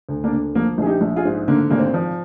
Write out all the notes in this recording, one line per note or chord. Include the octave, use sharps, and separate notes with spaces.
D2
A#3 D4
D3
F3 A#3
A#1 G#4
D#4 G4
A#1
F4 G#4
G#2
D3 A#3
G#1 A#3
C4
F3